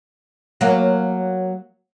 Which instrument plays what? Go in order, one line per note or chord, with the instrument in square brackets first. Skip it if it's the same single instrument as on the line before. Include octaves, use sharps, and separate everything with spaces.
[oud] F#3 A#3